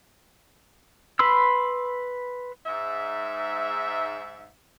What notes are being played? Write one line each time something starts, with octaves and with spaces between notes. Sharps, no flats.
B4 B5 C6 E6
G#2 E5